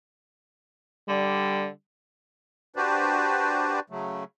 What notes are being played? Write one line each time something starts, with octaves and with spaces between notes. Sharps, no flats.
D3 G3
D4 F#4 G4 B4 C5 D5
C#3 F#3 A3